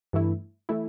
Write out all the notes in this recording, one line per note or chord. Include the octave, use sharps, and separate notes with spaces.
G2 E3 A3 E4
E3 A3 E4